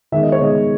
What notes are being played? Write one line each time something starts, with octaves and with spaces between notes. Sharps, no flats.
D#3 G#3 B3 E5
D#5
C#5
D#3 G#3 B3 D#5